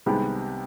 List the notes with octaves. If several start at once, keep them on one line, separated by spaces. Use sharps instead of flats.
C2 C3 D#3 G#3 B3 G4